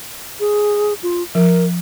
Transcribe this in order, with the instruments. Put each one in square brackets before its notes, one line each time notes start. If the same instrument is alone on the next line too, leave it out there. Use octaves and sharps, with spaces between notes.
[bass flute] G#4
F4
[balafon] F3 [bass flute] A#4